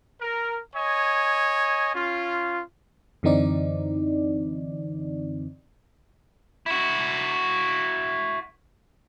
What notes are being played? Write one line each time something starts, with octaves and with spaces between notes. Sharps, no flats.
A#4
C#5 D#5 G#5
C#4 F4
F#2 D3 E3 C4 D#4 D5
E4 F#4